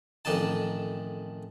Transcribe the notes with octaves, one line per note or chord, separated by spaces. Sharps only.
A1 F2 D#3 D4 D#4 A5